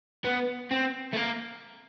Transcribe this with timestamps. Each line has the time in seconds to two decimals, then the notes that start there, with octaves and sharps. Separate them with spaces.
0.25 B3
0.71 C4
1.13 A3
1.16 A#3